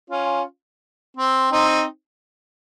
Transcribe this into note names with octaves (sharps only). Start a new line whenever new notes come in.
C#4 F4
C4
C4 D#4